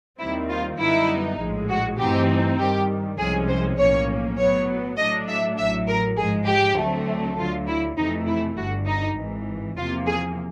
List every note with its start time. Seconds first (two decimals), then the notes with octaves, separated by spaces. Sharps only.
0.19 D#2 D#3 G3 C4 E4
0.49 F4
0.79 F#2 D3 G3 B3 D#4 E4
1.39 A#1 A2 F3 G#3
1.69 F#4
1.98 G2 E3 A3 C4 D#4 G4
2.58 G2 D#3 G3 G4
3.18 C2 C3 F3 G#3 C#4 G#4
3.48 C5
3.78 B1 A2 F3 A#3 C#4 C#5
4.38 A2 F#3 B3 C#5
4.98 A2 F#3 A3 D4 D#5
5.28 E5
5.58 A1 A2 F#3 E5
5.88 A#4
6.17 G#2 F3 G#3 G#4
6.48 G4
6.77 D2 D3 F#3 A3 C4
7.38 D2 D3 F#3 F4
7.67 E4
7.97 F2 C3 E3 A3 D#4
8.27 E4
8.57 G1 G2 D3 F#4
8.87 D#4
9.17 G#1 G#2 E3
9.77 E2 C3 F3 A#3 F4
10.06 G#4